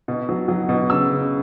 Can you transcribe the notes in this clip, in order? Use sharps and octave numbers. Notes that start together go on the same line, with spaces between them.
B2
F#3
F#3
B2
C#3 E6
C#3